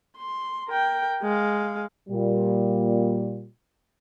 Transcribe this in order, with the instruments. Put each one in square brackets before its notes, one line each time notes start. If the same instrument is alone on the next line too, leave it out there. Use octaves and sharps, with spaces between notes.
[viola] C6
A#4 G5
G#3 F5
[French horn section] A#2 G3